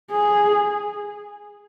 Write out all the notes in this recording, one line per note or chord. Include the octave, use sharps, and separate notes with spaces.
G#4